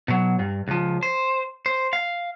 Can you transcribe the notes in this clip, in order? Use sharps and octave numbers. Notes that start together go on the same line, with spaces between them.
B2 F#3
G2
C#2 F3
C5
C5
F5